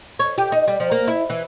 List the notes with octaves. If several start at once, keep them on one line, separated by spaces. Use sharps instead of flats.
C#5
G4
D#4
G3
F3
A#3
E4
E3